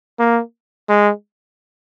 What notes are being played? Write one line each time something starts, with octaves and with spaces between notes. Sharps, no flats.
A#3
G#3